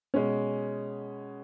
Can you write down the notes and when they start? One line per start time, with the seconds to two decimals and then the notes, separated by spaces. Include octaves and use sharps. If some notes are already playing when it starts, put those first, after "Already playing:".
0.14 B2 G#3 C#4